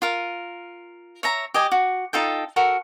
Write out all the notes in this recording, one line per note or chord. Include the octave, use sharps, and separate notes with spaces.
F4 A#4
C#5 E5 A#5
G4 D#5 G#5
F#4
D#4 F4 A4 G5
F#4 A4 A#4